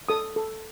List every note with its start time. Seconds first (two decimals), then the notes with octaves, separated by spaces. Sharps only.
0.09 A4 D#6
0.36 A4